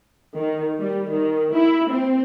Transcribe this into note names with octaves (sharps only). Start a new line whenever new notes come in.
D#3
G3
D#3
E4
C4